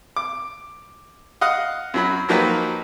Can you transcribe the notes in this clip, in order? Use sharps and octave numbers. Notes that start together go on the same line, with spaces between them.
D6
D#5 F5 F#5 D#6
F#2 F#3 B5
F3 F#3 A#3 D#4 G4 B4